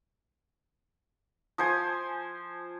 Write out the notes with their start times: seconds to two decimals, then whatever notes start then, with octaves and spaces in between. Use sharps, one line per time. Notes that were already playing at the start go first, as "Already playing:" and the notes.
1.58 F3 C5 G#5